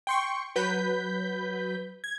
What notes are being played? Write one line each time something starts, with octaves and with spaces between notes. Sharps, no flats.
G5 C6 C#6
F#3 B4 G6 B6
G#6